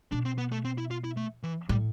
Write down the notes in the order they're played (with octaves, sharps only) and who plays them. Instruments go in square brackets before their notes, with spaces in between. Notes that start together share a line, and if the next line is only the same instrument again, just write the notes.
[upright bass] B2 [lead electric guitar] D4
[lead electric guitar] C4
B3
A3
C4
E4
F4
E4
A3
E3
[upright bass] A2 [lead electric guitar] G3